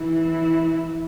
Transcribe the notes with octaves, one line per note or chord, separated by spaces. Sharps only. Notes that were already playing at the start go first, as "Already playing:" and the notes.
Already playing: E3 E4